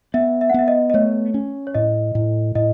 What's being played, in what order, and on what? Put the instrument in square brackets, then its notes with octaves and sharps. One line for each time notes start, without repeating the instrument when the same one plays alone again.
[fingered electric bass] B3 [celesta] E5
[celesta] E5
F#5
[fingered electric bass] B3 [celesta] E5
[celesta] D#5
D#5
[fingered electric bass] A3 [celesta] C#5
[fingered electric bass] C#4
[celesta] C#5
[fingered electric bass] A2 [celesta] D#5
[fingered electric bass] A2
[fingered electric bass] A2 [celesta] D#5